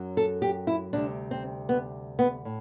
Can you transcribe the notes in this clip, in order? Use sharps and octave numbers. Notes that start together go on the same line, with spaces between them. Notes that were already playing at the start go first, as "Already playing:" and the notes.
Already playing: F#2 F#3
A4
G4
E4
D2 C3 G3 D4
C4
B3
B3
A2